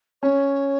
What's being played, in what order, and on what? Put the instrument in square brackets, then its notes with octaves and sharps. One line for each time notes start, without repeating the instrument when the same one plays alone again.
[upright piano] C#4 [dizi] C#5